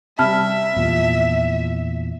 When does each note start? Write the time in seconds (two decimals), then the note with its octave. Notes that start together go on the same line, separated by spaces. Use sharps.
0.19 C3 G3 E5 A5 B5 F6
0.76 E2 A#2 F3